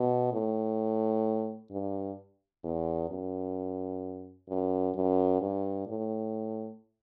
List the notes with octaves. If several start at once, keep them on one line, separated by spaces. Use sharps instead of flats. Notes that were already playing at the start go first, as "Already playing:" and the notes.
Already playing: B2
A2
G2
E2
F#2
F#2
F#2
G2
A2